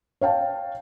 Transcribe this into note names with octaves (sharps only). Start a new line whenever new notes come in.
C#5 F5 G5 A5